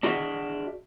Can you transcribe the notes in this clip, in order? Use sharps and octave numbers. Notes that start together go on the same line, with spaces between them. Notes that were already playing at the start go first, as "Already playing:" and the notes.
D4 F#4 G#4 D#5 E5